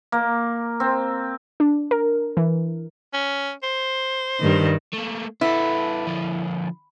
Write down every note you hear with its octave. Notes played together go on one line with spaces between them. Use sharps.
A#3
C4
D4
A#4
E3
C#4
C5
G2 D#3
A3 A#3
B3 E4 A4
D3 F3